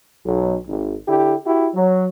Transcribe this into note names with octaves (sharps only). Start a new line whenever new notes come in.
B1
G#1
D3 E4 G4
E4 F#4 G4
F#3